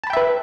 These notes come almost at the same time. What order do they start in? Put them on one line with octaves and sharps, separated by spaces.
A5 B5 G5 E5 B4